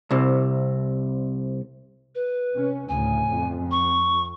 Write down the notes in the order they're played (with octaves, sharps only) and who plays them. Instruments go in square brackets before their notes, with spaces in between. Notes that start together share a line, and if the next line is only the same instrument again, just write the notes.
[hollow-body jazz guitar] C2 C3
[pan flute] B4
[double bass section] C3 C#4
[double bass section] D2 A2 C#3 [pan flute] G#5
[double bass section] F2
[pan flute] C#6